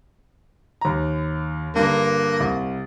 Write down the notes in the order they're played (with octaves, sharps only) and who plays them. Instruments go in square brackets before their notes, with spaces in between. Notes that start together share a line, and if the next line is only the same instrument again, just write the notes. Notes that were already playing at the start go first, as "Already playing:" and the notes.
[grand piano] D#2 A#5
[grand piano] G2 D3 [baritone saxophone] A#3
[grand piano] C2